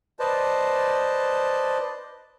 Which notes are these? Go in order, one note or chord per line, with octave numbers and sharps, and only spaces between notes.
B4 C5 D5 D#5 A5